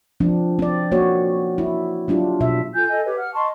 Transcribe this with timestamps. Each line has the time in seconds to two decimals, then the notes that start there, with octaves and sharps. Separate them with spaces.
0.20 F3 C4 D4
0.59 C4 D5
0.92 A#3 F#4 C#5
1.58 E4
2.08 F#3 D4 F4 G4
2.40 B2 E5
2.74 F4 A4 G#5 G6
2.87 A4 D#5 G#5
3.04 G4 B4 C#5
3.17 F#5 F6
3.34 D#5 A5 C6 C#6